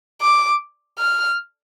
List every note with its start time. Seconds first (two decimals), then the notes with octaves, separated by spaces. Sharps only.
0.22 D6
0.99 F6